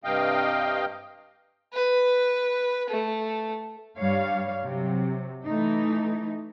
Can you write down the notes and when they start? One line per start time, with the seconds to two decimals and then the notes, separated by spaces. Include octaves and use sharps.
0.04 G2 C3 D#5 F5 G5
1.73 B4
2.90 A3
3.98 G2 G3 C#5 F5
4.64 C3 F#3
5.45 E3 A3 D#4